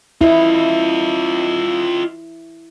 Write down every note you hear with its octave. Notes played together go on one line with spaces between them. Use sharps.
E4 F4 D#5